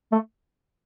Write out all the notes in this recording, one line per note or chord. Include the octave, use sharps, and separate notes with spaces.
A3